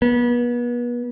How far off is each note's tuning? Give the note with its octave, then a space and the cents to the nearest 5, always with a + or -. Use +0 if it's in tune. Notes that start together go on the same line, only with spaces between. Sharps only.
B3 -35